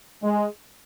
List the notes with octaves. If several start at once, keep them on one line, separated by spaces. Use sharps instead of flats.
G#3